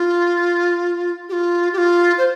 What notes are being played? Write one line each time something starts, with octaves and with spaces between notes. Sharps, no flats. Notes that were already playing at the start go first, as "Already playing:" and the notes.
Already playing: F4
G4
F4
G4
F4
C5